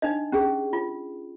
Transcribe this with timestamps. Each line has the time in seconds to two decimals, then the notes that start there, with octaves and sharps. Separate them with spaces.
0.02 D4 D#4 D#5
0.32 C#4 G4 G#4
0.73 F4